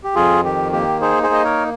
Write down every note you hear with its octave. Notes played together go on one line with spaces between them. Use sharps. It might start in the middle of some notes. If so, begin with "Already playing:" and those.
G4
F2 F4 G#4
D#3 G4
A#3 G4
D#4 G#4 C5
G#4 C5
A#3 D#5
A#4 C#5